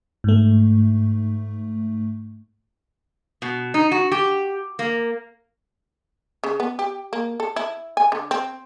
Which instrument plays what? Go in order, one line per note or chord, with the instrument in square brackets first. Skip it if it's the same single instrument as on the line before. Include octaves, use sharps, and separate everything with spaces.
[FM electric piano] G#2 A3
[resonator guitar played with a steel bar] B2
D#4
F#4
G4
A#3
[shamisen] C#3
B3
G4
A#3
A4
E4
G#5
D3
C4